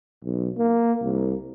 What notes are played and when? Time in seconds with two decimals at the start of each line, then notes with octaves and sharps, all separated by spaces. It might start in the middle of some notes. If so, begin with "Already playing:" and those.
0.24 B1
0.58 A#3
1.02 C2